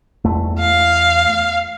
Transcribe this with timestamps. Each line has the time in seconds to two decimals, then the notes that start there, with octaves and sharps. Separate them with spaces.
0.25 E2 A3
0.59 F5